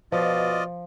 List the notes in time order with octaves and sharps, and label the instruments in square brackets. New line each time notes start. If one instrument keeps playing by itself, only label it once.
[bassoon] B2 [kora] F3 [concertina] F4 D5 D#5